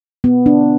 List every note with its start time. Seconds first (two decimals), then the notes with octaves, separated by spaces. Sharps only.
0.24 B3
0.46 D4